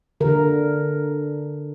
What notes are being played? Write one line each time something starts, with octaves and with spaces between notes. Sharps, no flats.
D3 A#4